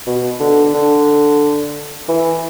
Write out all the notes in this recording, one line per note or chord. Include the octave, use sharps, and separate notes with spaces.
B2
D3
D3
E3